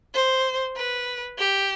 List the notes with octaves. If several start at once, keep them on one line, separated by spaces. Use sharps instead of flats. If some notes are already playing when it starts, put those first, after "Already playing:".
C5
B4
G4